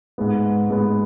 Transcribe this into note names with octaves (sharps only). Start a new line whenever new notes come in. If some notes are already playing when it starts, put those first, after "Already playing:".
G#2 G#3 B3
G#2 G#3 B3